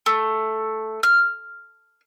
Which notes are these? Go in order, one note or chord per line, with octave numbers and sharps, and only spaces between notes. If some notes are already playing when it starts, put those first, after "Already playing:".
A3
F6